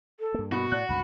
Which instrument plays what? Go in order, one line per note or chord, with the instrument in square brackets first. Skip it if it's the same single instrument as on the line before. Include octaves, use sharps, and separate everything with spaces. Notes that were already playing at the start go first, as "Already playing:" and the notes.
[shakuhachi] A4
[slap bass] G2 A#3
[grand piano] B2 [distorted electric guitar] F#4 [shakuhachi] B5
[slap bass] A2 [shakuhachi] D5 [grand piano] F#6
[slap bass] C#2 G2 C3 [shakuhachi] B5